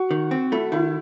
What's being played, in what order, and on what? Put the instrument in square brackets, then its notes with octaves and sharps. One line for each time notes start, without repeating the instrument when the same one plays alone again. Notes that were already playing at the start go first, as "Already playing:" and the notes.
Already playing: [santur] F#4
[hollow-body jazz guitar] D#3
C4
[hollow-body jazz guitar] A3 [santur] E4
[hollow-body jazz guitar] D#3 [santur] E4